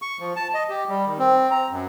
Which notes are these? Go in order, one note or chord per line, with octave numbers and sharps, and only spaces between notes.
C#6
F3
A5
D#5
G4
G3
D#3
C4
A#5
F#2